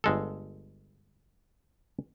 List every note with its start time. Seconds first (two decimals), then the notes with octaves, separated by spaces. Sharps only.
0.04 G1 G#3 A4